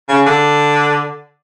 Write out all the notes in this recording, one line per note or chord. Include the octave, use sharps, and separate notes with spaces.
C#3
D3